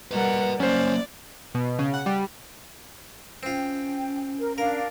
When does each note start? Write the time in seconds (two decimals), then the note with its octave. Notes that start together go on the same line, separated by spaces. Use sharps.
0.11 G3 A#4 B4 D#5 F#5
0.60 F#3 A#3 C#4 C5 D5
1.55 B2
1.79 C#3
1.94 F#5
2.06 G3
3.43 C4 C#4 F4 G5
4.40 A#4
4.58 D4 A#4 F5